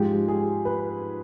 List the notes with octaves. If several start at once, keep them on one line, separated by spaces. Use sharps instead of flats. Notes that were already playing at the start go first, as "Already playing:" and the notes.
Already playing: G#2 F3 G#3 G4
G#4
B4